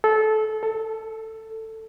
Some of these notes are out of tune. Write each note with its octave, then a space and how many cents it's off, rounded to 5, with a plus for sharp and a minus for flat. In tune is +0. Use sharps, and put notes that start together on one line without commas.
A4 -20
A4 +15